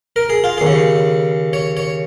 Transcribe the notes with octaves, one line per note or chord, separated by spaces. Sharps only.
A#4
G#4
F4
D#2 G#4
C#3
C#5
C#5